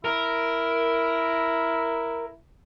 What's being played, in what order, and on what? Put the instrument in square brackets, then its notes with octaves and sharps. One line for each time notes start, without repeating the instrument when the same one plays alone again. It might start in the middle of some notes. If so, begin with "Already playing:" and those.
[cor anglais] E4 [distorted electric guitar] A#4